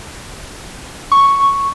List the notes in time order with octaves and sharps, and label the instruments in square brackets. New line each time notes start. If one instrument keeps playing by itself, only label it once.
[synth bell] C#6